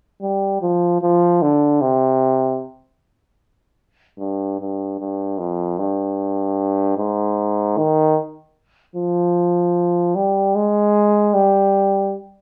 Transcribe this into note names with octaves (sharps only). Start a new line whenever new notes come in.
G3
F3
F3
D3
C3
G2
G2
G2
F2
G2
G#2
D#3
F3
G3
G#3
G3